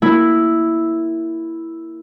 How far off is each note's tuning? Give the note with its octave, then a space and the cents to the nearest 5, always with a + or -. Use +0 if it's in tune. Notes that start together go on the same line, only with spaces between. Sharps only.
A#3 +0 E4 +0